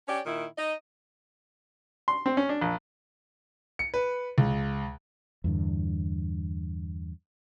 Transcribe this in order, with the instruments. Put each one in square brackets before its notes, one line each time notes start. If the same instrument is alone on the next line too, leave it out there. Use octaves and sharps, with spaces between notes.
[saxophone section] C#4 G4 C#5 D5
A#2 D#3 E4
D#4 D#5
[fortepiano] C6
C4
C#4
D4
A#1
[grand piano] C#7
B4
C#2
[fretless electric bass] E2 G2 D3